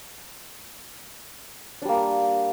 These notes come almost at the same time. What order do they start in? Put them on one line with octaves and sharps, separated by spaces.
D4 G3 A#3